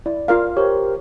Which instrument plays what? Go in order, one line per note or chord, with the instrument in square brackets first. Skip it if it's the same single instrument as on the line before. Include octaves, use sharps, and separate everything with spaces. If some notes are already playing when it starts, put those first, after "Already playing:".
[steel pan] E4 [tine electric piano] D5
[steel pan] F4 A#4 F5
[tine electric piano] G4 A#4 C5 [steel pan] C#5